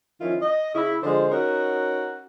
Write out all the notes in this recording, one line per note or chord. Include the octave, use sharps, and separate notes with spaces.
D#3 F3 C#4 E4 F4
D#5
C#3 C#4 E4
D3 F3 G#3 C5
C#4 D#4 F#4 A#4